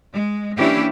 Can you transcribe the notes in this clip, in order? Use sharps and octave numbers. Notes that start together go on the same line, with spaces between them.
G#3
E3 A#3 C#4 D4 E4 G4